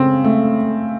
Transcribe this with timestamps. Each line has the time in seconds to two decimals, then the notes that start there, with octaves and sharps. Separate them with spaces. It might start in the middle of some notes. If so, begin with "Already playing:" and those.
Already playing: C#3 C4
0.24 A3